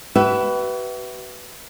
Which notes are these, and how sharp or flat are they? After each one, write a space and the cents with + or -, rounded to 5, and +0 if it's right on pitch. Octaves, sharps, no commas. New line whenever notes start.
F#4 +45 B4 +0 E5 +5